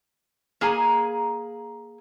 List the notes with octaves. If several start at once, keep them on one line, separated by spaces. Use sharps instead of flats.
A#3 G#4 G#5 A#5